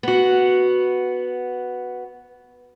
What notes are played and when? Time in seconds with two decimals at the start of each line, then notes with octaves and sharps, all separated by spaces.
0.03 B3 F#4